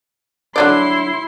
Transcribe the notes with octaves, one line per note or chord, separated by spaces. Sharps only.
D3 F#3 E4 D5 C6